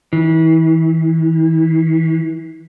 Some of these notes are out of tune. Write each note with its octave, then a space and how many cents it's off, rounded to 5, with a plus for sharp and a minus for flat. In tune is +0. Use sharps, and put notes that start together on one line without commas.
E3 -35